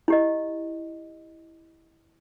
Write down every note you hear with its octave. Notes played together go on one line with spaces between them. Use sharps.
E4 G4 D#5